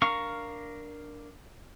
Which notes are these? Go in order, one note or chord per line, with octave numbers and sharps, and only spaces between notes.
D4 A#4 F5 A#5 C#6